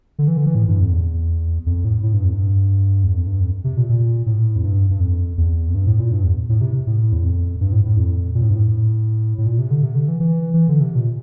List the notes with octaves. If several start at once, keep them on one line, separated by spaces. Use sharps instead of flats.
D3
E3
D3
E3
A2
G2
F2
E2
F2
A2
A2
G2
F2
G2
E2
F2
G2
F2
C3
A#2
A#2
A2
F2
G2
G2
F2
E2
F2
G2
A2
A#2
G2
E2
A2
C3
A2
E2
F2
G2
A2
A2
F2
A#2
A2
G2
A2
A2
A#2
C3
D3
C3
D3
E3
E3
E3
D3
C3
A#2